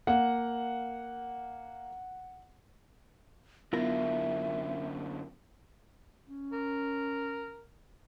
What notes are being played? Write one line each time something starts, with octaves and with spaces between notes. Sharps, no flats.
A#3 F5 F#5
F#2 D3 B3 E4 F4 A#4 E5
C#4
A#4